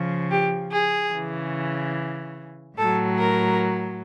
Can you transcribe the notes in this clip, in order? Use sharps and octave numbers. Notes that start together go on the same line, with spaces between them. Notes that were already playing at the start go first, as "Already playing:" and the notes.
Already playing: C#3 F3
G4
G#4
C#3 E3
A2 F#3 A4
A#4